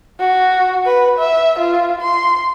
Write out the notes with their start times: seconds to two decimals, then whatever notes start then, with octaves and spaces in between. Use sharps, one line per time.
0.20 F#4
0.86 B4
1.19 E5
1.59 F4
2.01 C6